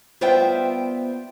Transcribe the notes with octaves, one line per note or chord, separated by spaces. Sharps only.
G3 B3 F4 C5 E5 G5